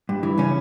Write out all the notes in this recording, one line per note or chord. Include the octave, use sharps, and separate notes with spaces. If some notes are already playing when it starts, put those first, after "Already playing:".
G2
E3
C#3 C#4